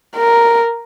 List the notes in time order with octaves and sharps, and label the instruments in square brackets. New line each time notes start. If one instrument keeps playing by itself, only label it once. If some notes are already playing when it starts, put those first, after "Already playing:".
[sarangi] A#4